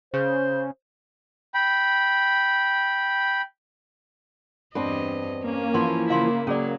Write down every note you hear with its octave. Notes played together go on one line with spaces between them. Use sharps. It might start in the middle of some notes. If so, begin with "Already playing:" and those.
C#3 C5
G5 B5
E2 G2 C4 D4 B4 D#5
A#3 C#4
E3 F3 F#5 C6
C#3 E4 F5 C6
C#3 F#3 C#4 G#4 D5